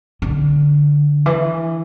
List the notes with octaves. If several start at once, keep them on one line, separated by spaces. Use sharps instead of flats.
D3
E3